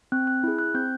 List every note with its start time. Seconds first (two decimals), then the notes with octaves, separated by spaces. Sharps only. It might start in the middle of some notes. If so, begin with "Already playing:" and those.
0.12 C4 F#6
0.27 F#6
0.44 E4 G#4
0.59 F#6
0.74 C4 G6